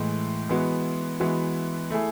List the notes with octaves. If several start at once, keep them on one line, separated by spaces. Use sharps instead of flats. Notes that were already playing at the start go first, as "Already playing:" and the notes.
Already playing: A2 E3 G#3
E3 G#3 B3 F#4
E3 G#3 B3 F#4
A3 E4 G#4